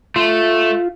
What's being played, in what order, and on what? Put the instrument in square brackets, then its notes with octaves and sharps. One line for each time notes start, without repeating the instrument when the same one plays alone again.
[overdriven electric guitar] A3 [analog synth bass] F4